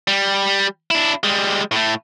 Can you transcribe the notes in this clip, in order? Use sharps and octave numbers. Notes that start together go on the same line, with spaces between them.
G3
D4 E4
G3 G#3
A2 A3